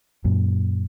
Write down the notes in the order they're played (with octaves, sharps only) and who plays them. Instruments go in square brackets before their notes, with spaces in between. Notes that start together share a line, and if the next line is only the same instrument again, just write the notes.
[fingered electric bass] F#2 A#2